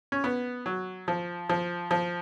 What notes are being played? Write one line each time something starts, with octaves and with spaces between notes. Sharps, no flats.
C#4
B3
F#3
F3
F3
F3